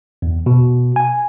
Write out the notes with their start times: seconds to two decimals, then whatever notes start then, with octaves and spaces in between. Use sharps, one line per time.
0.22 E2
0.46 B2
0.96 G#5